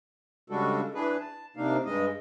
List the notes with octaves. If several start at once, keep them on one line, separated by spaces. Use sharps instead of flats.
C#3 G3 G#3 D4 F#4 A4
E3 D4 G#4 B4
A5
C3 A#3 D4 D#4 F5
G2 G#3 D#5